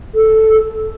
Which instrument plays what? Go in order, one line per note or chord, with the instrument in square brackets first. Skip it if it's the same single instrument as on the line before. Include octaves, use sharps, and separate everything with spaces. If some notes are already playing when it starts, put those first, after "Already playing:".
[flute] A4